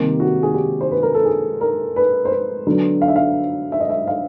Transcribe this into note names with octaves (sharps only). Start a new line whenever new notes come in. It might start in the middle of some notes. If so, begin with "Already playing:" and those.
Already playing: C3 D#3 G3 A#3 G4
F#4
G#4
G4
C5
B4
A#4
A4
G#4
A#4
B4
C5
B4
D3 F#3 B3
F5
E5
F5
E5
D#5
E5
F5